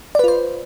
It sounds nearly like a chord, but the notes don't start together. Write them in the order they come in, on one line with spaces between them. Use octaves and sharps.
D5 B4 F4 C5